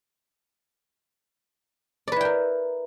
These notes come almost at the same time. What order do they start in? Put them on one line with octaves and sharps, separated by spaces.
D5 B4 E4 G5 A#4